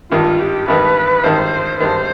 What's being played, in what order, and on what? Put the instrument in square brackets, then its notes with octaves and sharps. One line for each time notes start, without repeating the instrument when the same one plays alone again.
[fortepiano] G#1 G2 D#3 [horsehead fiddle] F4
[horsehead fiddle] G4
[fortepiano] G#1 G2 D#3 [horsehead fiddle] B4
[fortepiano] G#1 G2 D#3 [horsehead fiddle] C5
[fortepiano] G#1 G2 D#3 [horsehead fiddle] C5